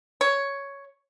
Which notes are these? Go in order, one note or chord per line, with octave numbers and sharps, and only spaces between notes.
C#5